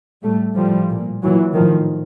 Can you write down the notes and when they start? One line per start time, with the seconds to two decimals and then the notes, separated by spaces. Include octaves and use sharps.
0.22 A2 G3 A3
0.55 A2 F3 G3
0.89 A#2
1.22 A#2 E3 F#3
1.55 A2 D#3 F3